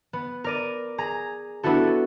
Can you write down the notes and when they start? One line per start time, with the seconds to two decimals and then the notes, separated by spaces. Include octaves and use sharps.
0.13 B3
0.44 A#4 D5 D#7
0.98 G#4 A#5
1.63 B3 D4 E4 F#4 A4